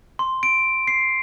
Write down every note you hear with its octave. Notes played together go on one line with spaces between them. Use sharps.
C6
D7
C7